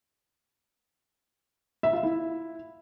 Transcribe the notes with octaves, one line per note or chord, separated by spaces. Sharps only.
E5
F4
E4